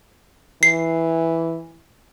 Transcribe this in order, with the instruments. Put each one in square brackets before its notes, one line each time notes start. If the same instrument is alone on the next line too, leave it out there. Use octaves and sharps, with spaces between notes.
[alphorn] E3 [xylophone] C7